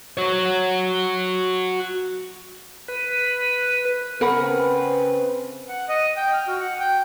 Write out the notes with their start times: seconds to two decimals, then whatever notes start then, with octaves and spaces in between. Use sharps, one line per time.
0.17 F#4 C#5
2.88 B4
4.21 C#3 C4 A#4 B4 F#5 B5
5.69 F#5
5.89 D#5
6.16 G5
6.33 F6
6.48 F#4
6.60 F#5
6.80 G5